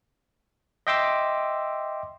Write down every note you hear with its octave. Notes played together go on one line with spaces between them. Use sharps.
D#5 E5 G5 C6 D6 E6